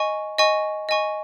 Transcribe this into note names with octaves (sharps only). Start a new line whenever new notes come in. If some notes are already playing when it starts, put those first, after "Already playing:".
Already playing: D#5 G#5 C#6
D#5 G#5 C#6
D#5 G#5 C#6